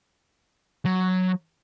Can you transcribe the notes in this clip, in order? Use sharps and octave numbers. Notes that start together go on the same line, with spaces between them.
F#3